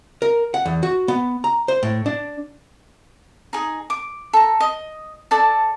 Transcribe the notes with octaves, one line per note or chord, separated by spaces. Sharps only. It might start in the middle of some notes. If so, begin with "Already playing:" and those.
A#4
F#5
E2
F#4
B3
A#5
C5
A2
D4
D#4 G#4
D6
A4 A#5
D#5
A4 D5 A5